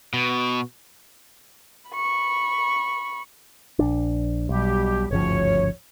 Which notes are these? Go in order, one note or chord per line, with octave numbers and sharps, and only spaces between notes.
B2
B5 C#6
A#1 D4
B1 B2 G3 G4
G1 D2 G#2 C#3 F3 C#5